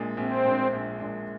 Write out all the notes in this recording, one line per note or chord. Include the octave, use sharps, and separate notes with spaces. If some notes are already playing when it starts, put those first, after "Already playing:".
Already playing: A#1 A#2 G#3 D4
A#1 C4
A#2 G#3 D4
A#1
A#2 G#3 D4